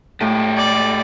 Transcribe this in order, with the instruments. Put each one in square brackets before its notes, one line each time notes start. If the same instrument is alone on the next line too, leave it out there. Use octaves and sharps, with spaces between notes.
[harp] A2 [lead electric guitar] G#3 G4
[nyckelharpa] D5